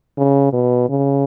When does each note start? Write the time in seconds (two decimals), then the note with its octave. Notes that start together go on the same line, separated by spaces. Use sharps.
0.18 C#3
0.53 B2
0.89 C#3